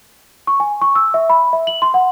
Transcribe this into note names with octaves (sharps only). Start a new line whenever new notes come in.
C#6
G#5
C#6
E6
E5
B5
E5
F#7
C6
F#5